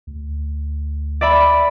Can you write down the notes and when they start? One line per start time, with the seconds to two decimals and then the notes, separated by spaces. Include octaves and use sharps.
0.07 D2
1.21 D5 E5 B5